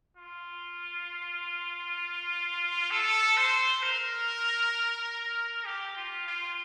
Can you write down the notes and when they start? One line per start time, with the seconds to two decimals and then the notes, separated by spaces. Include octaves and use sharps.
0.17 F4
2.91 A4
3.37 C5
3.83 A#4
5.65 G4
5.96 F4
6.27 F4